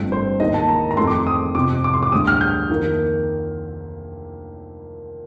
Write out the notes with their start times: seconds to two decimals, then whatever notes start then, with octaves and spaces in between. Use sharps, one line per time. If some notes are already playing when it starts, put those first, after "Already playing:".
Already playing: G1 G2 F3 A3 C4
0.12 C5
0.40 D#2 D#3 A#3 D#5
0.54 A5
0.69 A#5
0.91 A#5
0.97 F2 D#3 A3 C4 C6
1.07 D6
1.27 D#6
1.55 F2 C3 F3 C4 D6
1.84 D6
1.93 C6
2.03 D6
2.12 D2 D3 G3 D#6
2.27 F6
2.41 G6
2.70 F2 D#3 A#3